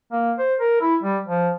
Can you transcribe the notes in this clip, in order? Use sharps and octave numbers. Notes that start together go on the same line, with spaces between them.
A#3
C5
A#4
E4
G3
F3